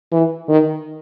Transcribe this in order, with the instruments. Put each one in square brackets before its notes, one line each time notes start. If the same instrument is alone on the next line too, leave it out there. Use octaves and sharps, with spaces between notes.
[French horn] E3
D#3